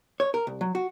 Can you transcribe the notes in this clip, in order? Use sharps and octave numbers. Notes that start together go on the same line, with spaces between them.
C#5
A#4
C2
F#3
F#4